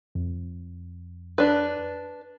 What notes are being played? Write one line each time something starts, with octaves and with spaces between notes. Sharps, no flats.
F2
D4 B4